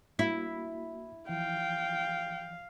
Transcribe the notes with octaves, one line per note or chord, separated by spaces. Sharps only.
A#3 E4 F#4
E3 F3 F5 G5